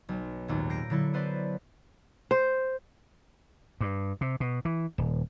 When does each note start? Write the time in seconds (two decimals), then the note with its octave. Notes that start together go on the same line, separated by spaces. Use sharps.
0.09 B1 F#3
0.48 G#1 D#2 A#2
0.70 G6 A#6 C7 D7
0.90 D3 F#3 E4 A4
1.14 B3 B4 C5 D5
2.31 C5
3.81 G2
4.21 C3
4.40 B2
4.65 E3
4.98 D#1